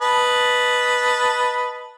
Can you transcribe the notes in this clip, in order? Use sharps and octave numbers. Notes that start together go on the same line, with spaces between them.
B4 D#5 A5